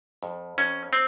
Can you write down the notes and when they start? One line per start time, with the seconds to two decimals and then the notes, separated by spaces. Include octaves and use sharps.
0.23 F2
0.58 F2 C#4
0.93 C4